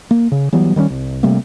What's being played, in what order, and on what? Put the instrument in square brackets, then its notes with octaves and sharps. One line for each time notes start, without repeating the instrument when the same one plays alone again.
[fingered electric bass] A#3
C#3
E3 F#3 G3 B3
D#3 G3 G#3 C#4
C2
C3 G3 A3 A#3